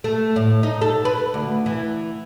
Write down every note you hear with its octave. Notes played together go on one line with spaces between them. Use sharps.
A3
A2
D#4
A4
B4
D2
E3